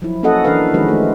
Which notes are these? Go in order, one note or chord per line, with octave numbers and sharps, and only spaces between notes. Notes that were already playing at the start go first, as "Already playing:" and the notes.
F3 F#3 E4
A#3 C#4 F#4 A4 D#5 F#5
E3 D4 A#4 B4 F5
D#3 F3 G#3 C#4 F#4 B4
A3